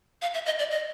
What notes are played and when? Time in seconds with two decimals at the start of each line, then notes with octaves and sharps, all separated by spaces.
0.22 F5
0.34 E5
0.46 D#5
0.59 D5
0.71 D#5